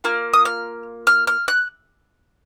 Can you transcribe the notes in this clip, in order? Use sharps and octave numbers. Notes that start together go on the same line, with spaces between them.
A#3 F4 F6
D#6
F6
F6
F6
F#6